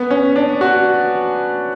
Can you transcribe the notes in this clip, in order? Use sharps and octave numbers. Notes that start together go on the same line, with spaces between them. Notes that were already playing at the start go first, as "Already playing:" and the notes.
Already playing: B3
C#4
D4
F#4